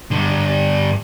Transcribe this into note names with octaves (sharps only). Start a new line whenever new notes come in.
G2 D3